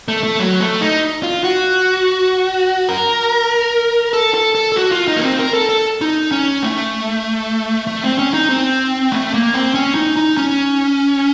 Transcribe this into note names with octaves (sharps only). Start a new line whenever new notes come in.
A3
A3
F#3
A3
D#4
F4
F#4
A#4
A4
A4
A4
A4
F#4
F4
D#4
A#3
C4
A#4
A4
A4
D#4
C#4
A3
A3
C4
C#4
D#4
C4
A3
A#3
C4
C#4
D#4
D#4
C#4